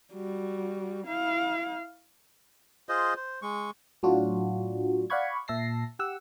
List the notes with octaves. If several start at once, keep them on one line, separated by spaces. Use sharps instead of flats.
G3 F#4
E4 F5
F4 G#4 C5 D#5
C5
G#3 C#6
A2 F#3 D4 F4 F#4
D5 F5 F#5 B5 C#6 G#6
A#2 E5 A5 A#6 C7
G4 F#5 E6